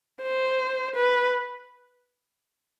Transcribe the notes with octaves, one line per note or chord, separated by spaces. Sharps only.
C5
B4